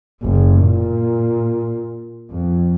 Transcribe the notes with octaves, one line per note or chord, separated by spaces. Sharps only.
F#1
A#2
F2